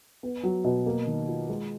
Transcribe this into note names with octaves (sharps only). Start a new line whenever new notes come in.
B3
F#3
B2
A#3
D#3
F4
G#3